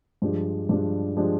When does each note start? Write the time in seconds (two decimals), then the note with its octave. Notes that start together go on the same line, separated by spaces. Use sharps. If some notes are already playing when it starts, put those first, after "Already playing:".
0.22 G2 F3 G#3 D4 G4
0.69 G2 F3 G#3 D4 G4
1.17 F3 G#3 D4 G4